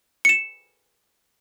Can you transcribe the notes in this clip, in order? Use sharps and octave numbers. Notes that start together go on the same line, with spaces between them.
C#7 E7